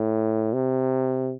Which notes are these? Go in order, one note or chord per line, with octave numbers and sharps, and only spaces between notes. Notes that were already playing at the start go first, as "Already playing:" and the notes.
Already playing: A2
C3